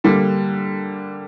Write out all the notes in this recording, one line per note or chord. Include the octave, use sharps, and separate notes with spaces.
D3 G3 A#3